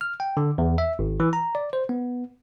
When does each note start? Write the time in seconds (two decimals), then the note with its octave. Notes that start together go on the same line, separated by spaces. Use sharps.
0.01 F6
0.20 G5
0.37 D3
0.58 E2
0.78 E5
0.99 G#1
1.20 E3
1.33 A#5
1.55 D5
1.73 C5
1.89 B3